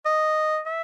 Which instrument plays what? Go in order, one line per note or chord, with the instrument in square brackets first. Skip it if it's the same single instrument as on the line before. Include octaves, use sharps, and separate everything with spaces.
[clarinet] D#5
E5